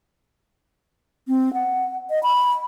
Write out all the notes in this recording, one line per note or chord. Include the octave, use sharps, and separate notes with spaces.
C4
F#5
D#5
B5